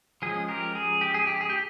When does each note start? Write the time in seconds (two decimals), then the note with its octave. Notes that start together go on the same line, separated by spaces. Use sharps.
0.22 F3 G#3 C#4 G#4
0.48 G4 A#4
0.75 G#4
1.01 G4
1.14 G#4
1.27 G4
1.41 G#4
1.49 G4